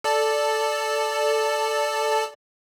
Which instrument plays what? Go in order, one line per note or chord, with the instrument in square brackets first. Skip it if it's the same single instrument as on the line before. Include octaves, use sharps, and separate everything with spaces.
[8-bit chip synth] A4 D5 A5